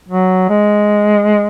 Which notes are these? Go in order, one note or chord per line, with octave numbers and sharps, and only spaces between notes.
F#3
G#3